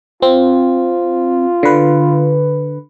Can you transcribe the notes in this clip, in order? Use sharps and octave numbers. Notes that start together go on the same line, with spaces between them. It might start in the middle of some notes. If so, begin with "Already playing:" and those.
C4 F4
D3 B4